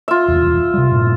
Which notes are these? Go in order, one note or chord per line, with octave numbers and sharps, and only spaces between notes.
F4 E5
D1 E2
C3 G3
G2 A#2